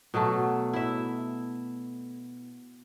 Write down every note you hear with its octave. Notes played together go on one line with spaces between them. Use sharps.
B2 F#3 A3 A4
E4 E5